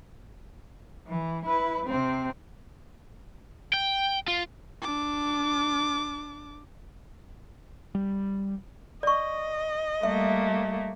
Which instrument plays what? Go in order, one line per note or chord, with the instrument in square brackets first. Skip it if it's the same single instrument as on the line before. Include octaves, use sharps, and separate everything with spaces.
[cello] E3
E4 B4
C3 C4
[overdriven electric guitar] G5
F4
[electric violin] D4 D6
[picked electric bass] G3
[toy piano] D5 C#6 [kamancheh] D#5
[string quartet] G3 A3 A#3 [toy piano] E5